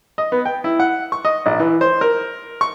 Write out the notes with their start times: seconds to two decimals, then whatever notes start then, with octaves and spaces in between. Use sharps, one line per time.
0.18 D#5
0.32 B3
0.45 G5
0.64 E4
0.80 F#5
1.12 C#6
1.25 D#5
1.46 A#1
1.59 E3
1.81 C5
2.01 A#4
2.61 C#6